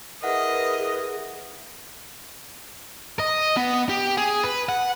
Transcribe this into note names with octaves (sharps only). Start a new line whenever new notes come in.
E4 G#4 A#4 B4 D#5 F#5
D#5
B3
G4
G#4
B4
F#5